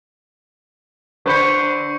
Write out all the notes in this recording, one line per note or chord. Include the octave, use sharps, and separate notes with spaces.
D3 B4 C5 B5 C#6 G6 C#7